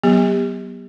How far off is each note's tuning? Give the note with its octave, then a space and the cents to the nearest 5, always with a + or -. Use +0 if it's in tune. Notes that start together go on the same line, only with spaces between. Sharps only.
F#3 +15 B3 -25 G4 +30